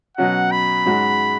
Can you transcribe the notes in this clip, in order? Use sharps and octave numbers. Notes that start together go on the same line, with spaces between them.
B2 F#3 C#4 F#4 F#5
B5
G#2 G#3 C#4 F#4